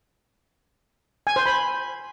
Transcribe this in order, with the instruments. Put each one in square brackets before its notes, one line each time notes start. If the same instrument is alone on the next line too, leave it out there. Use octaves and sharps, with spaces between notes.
[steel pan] G#5
C5
B5